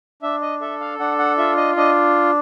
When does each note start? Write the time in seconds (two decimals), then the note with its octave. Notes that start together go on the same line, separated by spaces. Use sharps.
0.22 D4 E5
0.41 D#5
0.61 A4 E5
0.80 F5
0.99 D4 F#5
1.19 F#5
1.38 F4 E5
1.57 D#5
1.76 D4 D#5